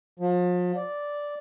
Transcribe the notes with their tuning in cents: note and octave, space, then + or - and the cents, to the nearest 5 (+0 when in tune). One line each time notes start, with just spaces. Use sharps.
F3 +40
D5 -5